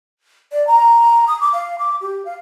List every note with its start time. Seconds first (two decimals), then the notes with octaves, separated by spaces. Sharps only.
0.52 D5
0.67 A#5
1.28 D#6
1.41 D6
1.53 F5
1.79 D6
2.01 G4
2.25 F5